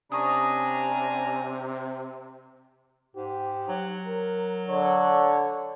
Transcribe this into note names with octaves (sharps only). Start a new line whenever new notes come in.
C3 C#4 D4 G#5 A#5 C#6 D#6
G#2 G4
F#3
A#4
D3 C#5